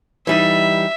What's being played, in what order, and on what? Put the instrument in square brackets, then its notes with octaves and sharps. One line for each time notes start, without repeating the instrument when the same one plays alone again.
[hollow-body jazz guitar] E3 G3 D#4 [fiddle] E5